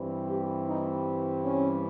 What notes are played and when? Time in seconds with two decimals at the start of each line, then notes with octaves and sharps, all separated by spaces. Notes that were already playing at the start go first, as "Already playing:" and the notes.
Already playing: G2 E3 G3 C4
0.27 G4
0.66 D#4
1.43 C#4